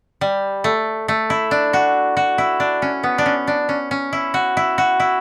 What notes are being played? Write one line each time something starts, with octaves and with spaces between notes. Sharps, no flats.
G3
A3
A3
E4
D4
F#4
F#4
E4
D4
C#4
B3
D4
C#4
D4
C#4
C#4
E4
F#4
E4
F#4
E4